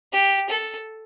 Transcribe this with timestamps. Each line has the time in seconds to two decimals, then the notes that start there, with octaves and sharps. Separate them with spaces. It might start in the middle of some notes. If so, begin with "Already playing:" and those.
0.13 G4
0.49 A4